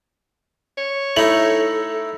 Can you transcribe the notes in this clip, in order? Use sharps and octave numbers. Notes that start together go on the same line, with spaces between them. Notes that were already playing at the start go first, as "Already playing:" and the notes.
C#5
A3 D#4 E4 A4 F7 F#7